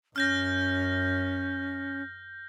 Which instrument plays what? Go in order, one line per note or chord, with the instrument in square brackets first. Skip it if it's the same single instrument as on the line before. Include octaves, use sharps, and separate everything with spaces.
[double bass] F#2 [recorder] C#4 [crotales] F6 G6 A#6